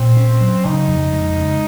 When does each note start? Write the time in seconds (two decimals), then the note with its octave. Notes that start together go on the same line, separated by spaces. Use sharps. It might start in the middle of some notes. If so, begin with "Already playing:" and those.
Already playing: A#2 C4
0.17 C#4
0.41 F#3
0.65 C#3 D#4
0.88 F2
1.13 G#3
1.37 C#3